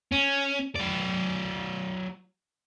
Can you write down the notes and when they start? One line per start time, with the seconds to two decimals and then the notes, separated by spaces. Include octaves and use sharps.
0.12 C#4
0.76 F#3 D5